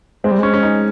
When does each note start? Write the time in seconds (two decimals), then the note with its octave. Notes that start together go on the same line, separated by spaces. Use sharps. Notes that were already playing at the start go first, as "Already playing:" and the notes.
0.24 G#3 C4
0.31 G3
0.39 G#3 C#4
0.54 C#4
0.63 D#4